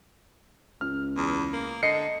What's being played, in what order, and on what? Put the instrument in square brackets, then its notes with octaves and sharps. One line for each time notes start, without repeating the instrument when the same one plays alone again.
[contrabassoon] C#2 [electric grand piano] F6
[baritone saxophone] E2
A#3
[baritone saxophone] D3 [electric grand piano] D#5 C7 C#7